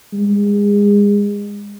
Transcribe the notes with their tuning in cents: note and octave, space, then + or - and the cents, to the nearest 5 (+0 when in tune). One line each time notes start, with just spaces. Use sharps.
G#3 -30